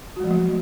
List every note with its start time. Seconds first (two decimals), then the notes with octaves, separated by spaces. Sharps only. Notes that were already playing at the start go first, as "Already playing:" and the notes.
0.16 F#4
0.20 G#3
0.24 F3
0.27 A3
0.31 F#3